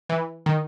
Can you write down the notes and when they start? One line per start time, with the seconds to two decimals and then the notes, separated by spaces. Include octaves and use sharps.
0.09 E3
0.46 D#3